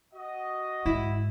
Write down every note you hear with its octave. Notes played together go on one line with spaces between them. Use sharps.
F#4 D#5
G#2 E4